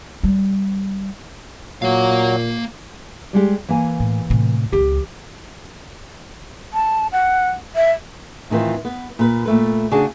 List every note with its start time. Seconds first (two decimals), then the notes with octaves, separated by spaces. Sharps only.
0.23 G3
1.82 A#2 F#3 A#3 F5
3.33 G3 G#3 G4
3.69 E3 A#3 G#5
4.00 A2
4.30 A2 C3
4.72 C#2 E3 G4
6.74 A5
7.12 F#5
7.76 E5
8.50 A2 D#3 E3 C4 F4
8.85 B3
9.19 A#2 B4
9.45 A#2 A3 B4
9.91 C#3 D4 F#4 G#4 A5